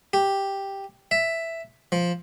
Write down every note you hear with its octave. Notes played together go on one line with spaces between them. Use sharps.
G4
E5
F3